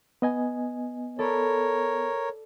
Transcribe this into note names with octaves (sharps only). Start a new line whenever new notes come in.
B3 D#5 G#5
A4 A#4 C#5 D5 B5